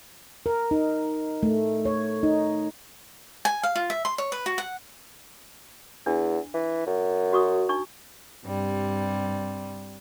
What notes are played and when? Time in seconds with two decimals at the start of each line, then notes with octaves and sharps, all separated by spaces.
0.46 A#4
0.71 D#4
1.43 A3
1.85 C#5
2.23 D#4
3.45 G#5
3.63 F5
3.76 F4
3.90 E5
4.05 C6
4.18 C#5
4.32 B4
4.46 F#4
4.58 F#5
6.06 E2 D4
6.54 E3
6.87 F#2
7.33 F#4 C#6 D#6
7.69 D4 D#4 C#6
8.46 G2 C3 G3